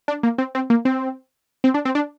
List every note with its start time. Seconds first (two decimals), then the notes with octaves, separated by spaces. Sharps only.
0.08 D4
0.23 A#3
0.38 C4
0.55 C4
0.70 A#3
0.85 C4
1.64 C4
1.74 D4
1.85 C4
1.95 D4